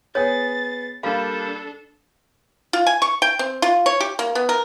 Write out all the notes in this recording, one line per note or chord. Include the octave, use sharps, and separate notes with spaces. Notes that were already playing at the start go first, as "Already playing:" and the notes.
B3 G#4 C#5 A6
G3 A#3 D4 A4 F5 B5
F4
G#5
C#6
G5
C4
F4
C#5
G4
A#3
B3
A#4